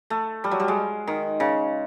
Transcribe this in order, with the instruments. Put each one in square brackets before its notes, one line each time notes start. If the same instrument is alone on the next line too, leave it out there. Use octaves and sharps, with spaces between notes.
[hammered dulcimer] A3
G3
F#3
G3
G#3
D#3
C#3